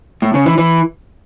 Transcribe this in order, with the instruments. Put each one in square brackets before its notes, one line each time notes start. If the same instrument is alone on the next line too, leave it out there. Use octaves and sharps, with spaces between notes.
[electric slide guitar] A2
C#3
E3
E3